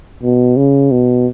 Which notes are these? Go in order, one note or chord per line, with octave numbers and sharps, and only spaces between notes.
B2
C#3
B2